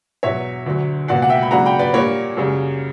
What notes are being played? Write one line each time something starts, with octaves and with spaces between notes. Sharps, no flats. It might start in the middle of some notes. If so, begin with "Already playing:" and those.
E2 B2 F#3 C#5 E5
D2 D3 F#3
C#2 B2 A#3 D5 F#5
F#5
E5 G5
B5
C#3 F#3 A#3 D4 F#5 A#5
G5 B5
B4 D5
A#2 G3 A#3 D4 A#4 C#5
F#2 C#3 G3